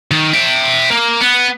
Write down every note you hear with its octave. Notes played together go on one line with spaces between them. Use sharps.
D#3
E5 G5
A#3
B3